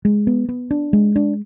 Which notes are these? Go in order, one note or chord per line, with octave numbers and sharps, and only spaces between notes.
G#3
B3
B3
D4
G#3
D4